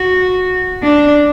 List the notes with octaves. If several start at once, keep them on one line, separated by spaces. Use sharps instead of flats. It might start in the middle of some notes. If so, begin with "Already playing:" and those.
Already playing: F#4
D4